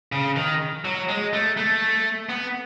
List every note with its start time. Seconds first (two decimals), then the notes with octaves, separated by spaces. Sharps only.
0.12 C#3
0.36 D#3
0.85 F#3
1.09 G#3
1.33 A3
1.57 A3
2.29 B3